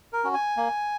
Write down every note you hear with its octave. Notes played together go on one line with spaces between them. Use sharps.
A#4
C#4 F#4
G#5
A#3